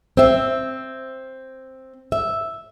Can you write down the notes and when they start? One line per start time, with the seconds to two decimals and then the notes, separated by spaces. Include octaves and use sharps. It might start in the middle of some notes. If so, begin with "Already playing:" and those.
0.17 C4 E5
2.12 E5